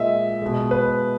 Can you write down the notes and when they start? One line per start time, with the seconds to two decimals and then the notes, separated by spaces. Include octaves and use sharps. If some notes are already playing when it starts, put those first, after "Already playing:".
Already playing: A#2 G#3 D#5 E5
0.42 B2 G#3
0.71 B4